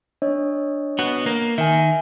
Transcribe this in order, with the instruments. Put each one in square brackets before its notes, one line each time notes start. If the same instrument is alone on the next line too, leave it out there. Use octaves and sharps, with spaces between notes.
[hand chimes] D4 C#5 D#5
[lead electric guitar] B3 F#4
A#3
[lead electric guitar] D#3 [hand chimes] E5 G#5